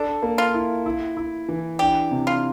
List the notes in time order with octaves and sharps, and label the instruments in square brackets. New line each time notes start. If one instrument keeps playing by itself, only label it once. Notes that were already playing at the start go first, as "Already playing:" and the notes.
Already playing: [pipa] D4 [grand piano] A4
[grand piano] A#3
[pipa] F4
[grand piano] E4
E4
E4
E3
[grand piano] D4 [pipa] G4
[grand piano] C3
[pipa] F4